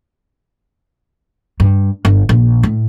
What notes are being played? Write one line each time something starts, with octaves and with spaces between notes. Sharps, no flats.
G2
G1
A#1
A2